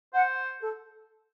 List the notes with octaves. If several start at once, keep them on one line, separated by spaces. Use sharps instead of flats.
C5 F#5
A4